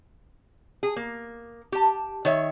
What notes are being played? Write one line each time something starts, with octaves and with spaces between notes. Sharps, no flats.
G#4
A#3
G4 A5
D#3 C#5 E5